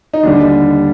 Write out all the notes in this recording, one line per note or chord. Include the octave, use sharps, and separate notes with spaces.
D#4
D#2 D3 G3 D4